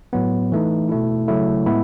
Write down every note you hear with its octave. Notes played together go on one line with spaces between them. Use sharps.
A2 F#3 B3
E3 A3 D#4
B2 A3 E4
C#3 F#3 A3 E4
A2 G#3 B3 E4